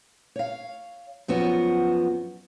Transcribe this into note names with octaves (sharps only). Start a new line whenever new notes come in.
C#5 F5
F#2 F3 B3 F#4